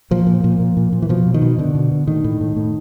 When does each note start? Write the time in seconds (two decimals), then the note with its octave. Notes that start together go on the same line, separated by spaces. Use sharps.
0.11 A#2 F3
0.27 A#2
0.44 A#2
0.60 A#2
0.77 A#2
0.93 A#2
1.02 E3
1.09 B2 F3
1.26 B2
1.34 D#3
1.42 B2
1.58 B2 D3
1.75 B2
1.92 B2
2.07 A2 D#3
2.24 A2
2.41 A2
2.56 A2